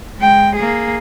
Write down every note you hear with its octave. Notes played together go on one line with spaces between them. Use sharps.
G#3 G5
A#3 G#4